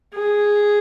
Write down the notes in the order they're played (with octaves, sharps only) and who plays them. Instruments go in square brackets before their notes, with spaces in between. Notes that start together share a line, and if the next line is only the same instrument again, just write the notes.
[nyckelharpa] G#4